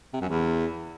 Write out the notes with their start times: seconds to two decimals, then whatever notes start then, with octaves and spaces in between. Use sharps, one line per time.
0.13 C3
0.21 F#2
0.29 E2